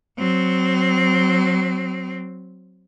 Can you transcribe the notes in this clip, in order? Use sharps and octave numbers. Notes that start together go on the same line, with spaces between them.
F#3 C4